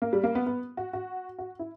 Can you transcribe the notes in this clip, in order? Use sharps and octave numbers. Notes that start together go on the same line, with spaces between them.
A#3
G3
A#3
B3
B3
F#4
F#4
F#4
E4